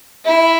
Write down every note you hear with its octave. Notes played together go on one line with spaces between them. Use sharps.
E4